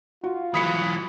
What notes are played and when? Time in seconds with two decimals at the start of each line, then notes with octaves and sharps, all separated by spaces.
0.24 F4 F#4
0.54 E3 F#3 B5 D#6 B6 C#7